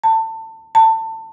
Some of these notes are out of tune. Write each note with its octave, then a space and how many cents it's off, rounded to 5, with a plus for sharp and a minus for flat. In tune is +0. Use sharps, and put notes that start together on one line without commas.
A5 +25
A5 +25